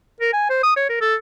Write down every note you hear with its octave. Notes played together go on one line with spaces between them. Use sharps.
A#4
G#5
C5
D#6
C#5
A#4
A4